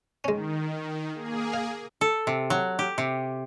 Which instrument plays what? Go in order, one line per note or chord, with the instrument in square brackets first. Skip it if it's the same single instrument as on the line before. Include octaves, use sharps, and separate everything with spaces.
[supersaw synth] D#3 [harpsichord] G#3 C#4
[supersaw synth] A#3 G#4
[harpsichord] F5
[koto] A4
C3
F#3
G4
C3